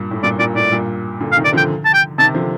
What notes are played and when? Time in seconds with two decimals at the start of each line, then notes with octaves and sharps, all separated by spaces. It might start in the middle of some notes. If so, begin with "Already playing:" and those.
Already playing: G2 A#2
0.11 A2
0.23 G2 A#2 D5
0.39 G2 A#2 D5
0.56 A2 D5
0.72 G2 A#2
1.20 A#2 D3
1.32 F5
1.36 C3 D#3
1.45 D5
1.53 D3 F3 G5
1.85 A5
1.94 G5
2.18 C3 D#3 A5
2.35 D3 F3